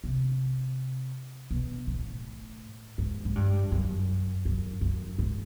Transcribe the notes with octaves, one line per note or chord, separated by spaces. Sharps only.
C3
B2
A2
G#2
G#2
G2
F#2
F#2
F#2
G#2